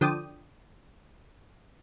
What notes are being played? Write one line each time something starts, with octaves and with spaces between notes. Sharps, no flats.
D3 F3 D5 G5 D#6